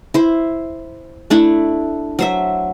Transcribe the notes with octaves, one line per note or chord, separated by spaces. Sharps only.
E4 C5
A3 D4 E4
F#3 C5 E5